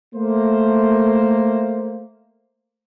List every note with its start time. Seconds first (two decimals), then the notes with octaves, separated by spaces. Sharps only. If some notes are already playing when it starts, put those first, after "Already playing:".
0.15 A3 A#3 C5